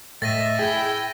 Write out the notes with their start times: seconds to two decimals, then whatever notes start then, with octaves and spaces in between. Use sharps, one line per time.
0.22 A2 D#5 E5 A6 A#6 D#7
0.59 E4 G#4 G5